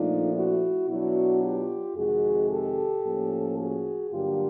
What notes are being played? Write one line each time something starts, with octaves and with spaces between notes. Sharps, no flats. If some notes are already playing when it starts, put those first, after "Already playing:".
Already playing: A#2 F3 A3 D4 D#4 F4
E4 F#4
B2 F#3 B3 D4 E4 F#4
F4 G4
F2 C3 D#3 G#3 F#4 G#4
G4 A4
A2 F3 A#3 C#4
F#4 G#4
G2 D3 F#3 A#3 D4 F4 G4